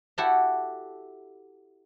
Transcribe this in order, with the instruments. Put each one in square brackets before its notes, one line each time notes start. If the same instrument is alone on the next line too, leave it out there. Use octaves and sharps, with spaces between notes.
[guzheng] E4 F#4 G4 A4 E5